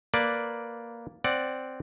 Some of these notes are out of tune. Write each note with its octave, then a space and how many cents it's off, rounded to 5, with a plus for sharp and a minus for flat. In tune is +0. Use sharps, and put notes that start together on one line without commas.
A#3 +0 B4 +0 D5 +0
C4 -5 D5 +0 F#5 +0